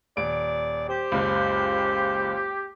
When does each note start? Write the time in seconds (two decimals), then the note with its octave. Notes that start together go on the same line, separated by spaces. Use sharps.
0.17 D#1 D5 D7
0.89 G4 C5
1.12 F#1 C#2